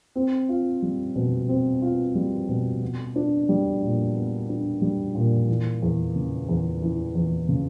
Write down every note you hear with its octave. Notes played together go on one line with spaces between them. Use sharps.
C4
F4
G3
B2
C4
F4
G3
B2
B3
D4
G3
A#2
B3
D4
G3
A#2
E3
E2
C#3
E2
E3
E2
C#3